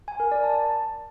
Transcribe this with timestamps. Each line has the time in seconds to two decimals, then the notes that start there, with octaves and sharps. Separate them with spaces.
0.08 G#5
0.20 A#4
0.32 D5
0.43 A5